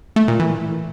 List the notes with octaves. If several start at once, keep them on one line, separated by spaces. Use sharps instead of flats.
A3
A#2
E3